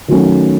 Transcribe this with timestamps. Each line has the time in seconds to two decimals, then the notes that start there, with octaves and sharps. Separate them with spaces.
0.08 D#3 F#3 A3 C#4